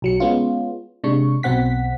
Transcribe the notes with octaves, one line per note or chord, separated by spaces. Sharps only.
B1 F#3 C#7
G#3 B3 C#4 F4
C3 G#3 D4 C#6
B1 B2 C4 F#5 B6